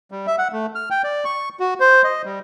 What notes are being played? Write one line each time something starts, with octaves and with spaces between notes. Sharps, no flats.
G3
E5
F#5
A3
F6
G5
D5
C#6
F#4
C5
D#5
G3